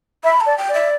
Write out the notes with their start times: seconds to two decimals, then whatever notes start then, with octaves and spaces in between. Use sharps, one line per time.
0.24 E5 B5
0.41 A5
0.46 D5
0.58 G5
0.69 D5 E5